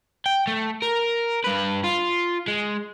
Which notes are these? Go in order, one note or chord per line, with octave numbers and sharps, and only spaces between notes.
G5
A3
A#4
G2 B4
F4
G#3